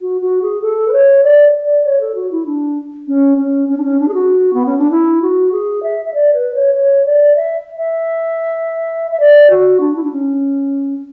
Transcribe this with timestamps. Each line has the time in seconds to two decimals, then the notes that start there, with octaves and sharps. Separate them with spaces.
0.01 F#4
0.21 F#4
0.42 G#4
0.62 A4
0.88 B4
0.93 C#5
1.24 D5
1.64 D5
1.85 C#5
2.01 A4
2.15 F#4
2.31 E4
2.46 D4
3.07 C#4
3.37 C#4
3.69 C#4
3.77 D4
3.83 C#4
3.99 D4
4.08 G#4
4.14 F#4
4.53 B3
4.66 C#4
4.78 D4
4.91 E4
5.22 F#4
5.52 G#4
5.83 E5
6.05 E5
6.14 D5
6.33 B4
6.55 C#5
6.74 C#5
7.05 D5
7.35 E5
7.77 E5
9.11 E5
9.20 D5
9.50 F#4
9.80 D4
9.96 E4
10.03 D4
10.12 C#4